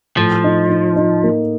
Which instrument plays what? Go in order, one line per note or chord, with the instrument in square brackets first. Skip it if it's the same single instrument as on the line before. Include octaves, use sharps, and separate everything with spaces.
[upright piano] A2 [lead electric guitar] F3
[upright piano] D#4
D#4
D#4
A#3